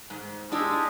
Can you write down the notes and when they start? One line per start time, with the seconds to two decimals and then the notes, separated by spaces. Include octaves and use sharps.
0.10 G#2
0.52 G#3 D4 E4 G4